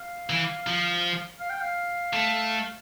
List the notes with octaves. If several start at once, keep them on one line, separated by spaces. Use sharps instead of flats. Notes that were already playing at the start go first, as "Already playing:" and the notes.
Already playing: F5
E3
F3
F5
G5
F5
A3